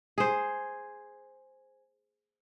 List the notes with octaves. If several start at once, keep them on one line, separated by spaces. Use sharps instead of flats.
G#4 C5